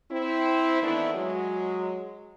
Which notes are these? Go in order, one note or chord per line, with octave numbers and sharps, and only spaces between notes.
C4 E4
D#3 E3 A3 B3 D4 E4
F#3 G#3